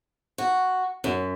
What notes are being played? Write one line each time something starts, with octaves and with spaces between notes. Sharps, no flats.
F#4
F#2